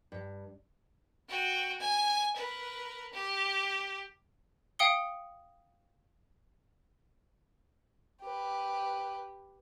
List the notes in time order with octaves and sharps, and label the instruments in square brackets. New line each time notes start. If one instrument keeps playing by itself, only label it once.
[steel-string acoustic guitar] G2
[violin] F#4 G5
G#5
A#4 B4
G4
[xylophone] F5 G5 D#6 C#7 G7
[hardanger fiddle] G4 B4